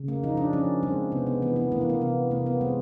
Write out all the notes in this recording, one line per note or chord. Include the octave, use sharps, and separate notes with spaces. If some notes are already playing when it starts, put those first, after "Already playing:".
Already playing: C#3
A#3
F3 D#4
D4
F3 C#4
G#3 C4
C3 B3
B3
E3 B3
B3
E3 A#3
B3
A#3
C3 B3
C3 A#3
B3
G#3 C4